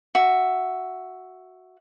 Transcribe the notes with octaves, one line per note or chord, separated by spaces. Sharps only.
F#4 E5